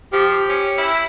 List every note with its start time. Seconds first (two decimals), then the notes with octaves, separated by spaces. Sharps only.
0.13 F3 G4
0.49 C#4
0.78 E4